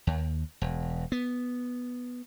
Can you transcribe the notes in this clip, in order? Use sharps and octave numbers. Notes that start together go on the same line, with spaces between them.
D#2
E1
B3